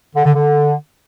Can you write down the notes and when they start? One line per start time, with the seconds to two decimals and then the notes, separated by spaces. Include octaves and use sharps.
0.15 D3
0.25 D3
0.35 D3